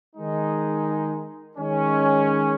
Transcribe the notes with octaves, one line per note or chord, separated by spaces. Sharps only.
D#3 G#3 D#4
D#3 G#3 C#4